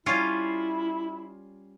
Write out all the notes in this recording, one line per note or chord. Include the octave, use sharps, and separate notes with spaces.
G3 C#4 E4 F4